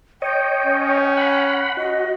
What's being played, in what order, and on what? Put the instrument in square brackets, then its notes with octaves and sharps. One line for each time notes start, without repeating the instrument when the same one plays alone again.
[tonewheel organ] C#5 D#5 [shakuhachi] G5
[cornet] C#4
[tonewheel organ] F#5 B5
[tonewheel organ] F#4 [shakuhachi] D#5